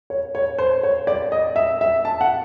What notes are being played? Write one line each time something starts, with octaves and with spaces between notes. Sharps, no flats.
C#5
C#5
C5
C#5
D5
D#5
E5
E5
A5
F#5